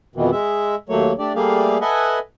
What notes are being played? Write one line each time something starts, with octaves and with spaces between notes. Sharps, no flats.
F2 B2 D#3 E3
G#3 E5
D#2 F#3 A3 A#3 C#5
A3 D4 G4 D5
G3 A3 A#3 G4 G#4 F5
A4 B4 D#5 E5 F#5 G#5